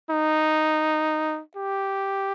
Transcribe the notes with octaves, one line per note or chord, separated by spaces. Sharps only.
D#4
G4